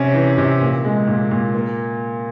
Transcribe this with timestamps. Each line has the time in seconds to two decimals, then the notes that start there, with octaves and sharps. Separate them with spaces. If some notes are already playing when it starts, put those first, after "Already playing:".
Already playing: C3 C#4
0.14 E3
0.38 C3
0.61 A#2
0.85 G#3
1.07 A#2
1.31 A#2
1.54 A#3